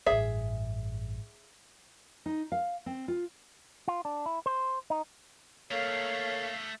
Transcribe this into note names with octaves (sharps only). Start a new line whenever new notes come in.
A1 G2 G#4 E5
D#4
F5
C4
F4
F4
D4
E4
C5
D#4
A3 A#3 A4 A#4 C#5 F5